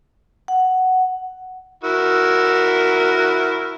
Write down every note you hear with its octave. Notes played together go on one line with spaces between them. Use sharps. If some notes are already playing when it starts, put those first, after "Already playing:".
F#5
E4 F#4 A#4